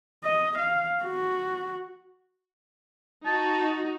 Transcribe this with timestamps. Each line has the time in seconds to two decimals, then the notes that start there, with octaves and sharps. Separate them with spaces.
0.24 D#5
0.58 F5
1.04 F#4
3.26 D#4 F#4 A5